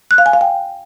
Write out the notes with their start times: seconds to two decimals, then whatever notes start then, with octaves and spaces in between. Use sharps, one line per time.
0.11 F#6
0.18 F5
0.26 G#5
0.33 F5
0.41 G5